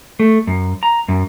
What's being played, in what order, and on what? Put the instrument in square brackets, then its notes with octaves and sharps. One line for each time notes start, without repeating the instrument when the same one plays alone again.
[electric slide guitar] A3
F#2
A#5
F#2